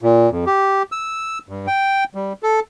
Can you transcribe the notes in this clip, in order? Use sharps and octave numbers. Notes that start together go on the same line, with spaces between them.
A#2
F2
G4
E6
G2
G5
G3
A4